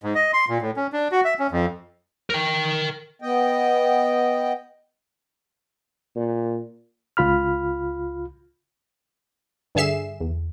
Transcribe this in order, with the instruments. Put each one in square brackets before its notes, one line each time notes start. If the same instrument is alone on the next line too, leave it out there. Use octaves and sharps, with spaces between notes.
[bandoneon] G#2
D#5
C6
A#2
A2
C#4
D4
F#4
E5
C#4
F2
[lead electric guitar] A#4 G5
[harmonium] B3 D#5 G5
[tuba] A#2
[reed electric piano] C#2 F4 B5 F6
[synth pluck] G2 D3 G#4 E5 C7 E7
E2